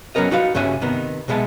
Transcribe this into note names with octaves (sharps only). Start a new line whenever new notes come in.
F#3 B3 C#4 A#4 D#5
D#4 F#4 B4 F5
G2 C#3 C#4 F#4 E5 G#5
C3 D#3 B3 D#4
B1 B2 G#3 B3 E5 A5